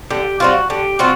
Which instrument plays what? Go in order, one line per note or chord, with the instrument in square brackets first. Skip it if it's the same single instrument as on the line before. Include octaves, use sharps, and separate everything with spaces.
[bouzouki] D3 [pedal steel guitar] G4
[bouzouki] G3 C4 F4 [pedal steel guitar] F#4
[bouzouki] D3 [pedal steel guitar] G4
[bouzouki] G3 C4 F4 [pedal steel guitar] F#4